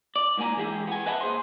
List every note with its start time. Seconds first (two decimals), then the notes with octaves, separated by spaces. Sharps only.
0.16 D5
0.37 G#2 A#3 G4 G#5 A#5
0.56 E3 G#3 E4 G4 G#4
0.87 B3 G#5
1.06 B4 D#5 E5 F#5 A5 B5
1.21 A#2 G#4 C5 C6